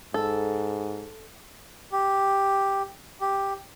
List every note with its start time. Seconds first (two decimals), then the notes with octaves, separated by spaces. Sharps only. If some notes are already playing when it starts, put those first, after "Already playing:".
0.14 G#2 A4
1.92 G4
3.21 G4